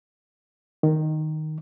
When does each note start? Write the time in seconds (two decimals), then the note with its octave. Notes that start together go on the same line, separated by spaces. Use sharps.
0.83 D#3